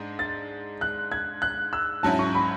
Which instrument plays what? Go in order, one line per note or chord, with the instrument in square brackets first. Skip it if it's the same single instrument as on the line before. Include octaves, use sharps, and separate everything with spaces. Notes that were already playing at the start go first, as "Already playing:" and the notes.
Already playing: [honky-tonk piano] G#2 G#3 D4
[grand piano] A6
F#6
G#6
F#6
E6
[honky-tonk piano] G#2 F#3 C#4 E4 [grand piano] A5
[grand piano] C#6
B5